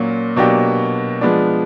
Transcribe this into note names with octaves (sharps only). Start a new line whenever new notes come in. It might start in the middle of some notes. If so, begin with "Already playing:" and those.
Already playing: A#2 F#3 A#3 C#4
B2 F#3 A#3 D4 G4
F3 G#3 B3 D4